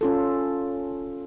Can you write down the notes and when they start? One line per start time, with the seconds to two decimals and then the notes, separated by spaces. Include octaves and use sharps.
0.01 C#4 F4 A4